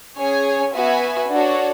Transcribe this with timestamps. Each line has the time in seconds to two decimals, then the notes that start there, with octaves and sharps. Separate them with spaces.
0.18 C#4 G#4 C#5 G#5
0.75 B3 F#4 B4 E5 G#5
1.31 D4 F#4 A4 C#5